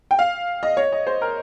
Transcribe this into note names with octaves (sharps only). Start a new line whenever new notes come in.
G5
F5
D#5
C#5
D#5
C5
A#4